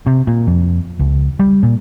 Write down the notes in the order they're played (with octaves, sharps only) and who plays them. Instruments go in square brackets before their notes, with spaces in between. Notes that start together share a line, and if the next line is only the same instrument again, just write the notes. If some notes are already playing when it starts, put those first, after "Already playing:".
[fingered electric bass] C3
A#2
F2
C#2
G3
A#2